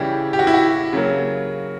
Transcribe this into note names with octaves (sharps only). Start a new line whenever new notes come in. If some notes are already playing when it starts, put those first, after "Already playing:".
Already playing: C#3 E3 G3 E4 G4
G4
F#4
E4
F#4
C#3 F#3 A#3